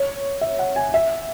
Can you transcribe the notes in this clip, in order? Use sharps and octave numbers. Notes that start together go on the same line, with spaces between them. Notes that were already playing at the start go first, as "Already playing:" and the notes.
Already playing: C#5
E5
F#5
G#5
E5